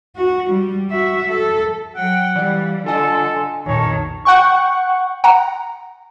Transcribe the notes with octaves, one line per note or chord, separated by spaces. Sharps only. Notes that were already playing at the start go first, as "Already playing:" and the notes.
F#4
G3
F#4 E5
A4
F#3 F#5 G5
E3 G3 D5 F5
D3 F4 A4 D#5 G#5 C6
G#5
B1 F2 A#2 D#3 C#5 A5
F#5 G5 C#6
F#5 A#5